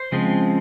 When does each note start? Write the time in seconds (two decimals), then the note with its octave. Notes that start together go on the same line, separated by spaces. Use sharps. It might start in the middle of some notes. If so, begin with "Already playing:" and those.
Already playing: C5
0.12 C#3 F3 G#3 C4